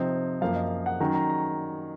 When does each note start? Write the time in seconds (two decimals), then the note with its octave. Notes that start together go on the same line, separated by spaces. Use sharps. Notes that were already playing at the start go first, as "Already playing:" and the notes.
Already playing: C3 F3 C4 D#4
0.41 F#2 F3 A#3 F5
0.56 D#5
0.86 F#5
1.00 D#3 F#3 C#4 A#5
1.15 A#5
1.29 A#5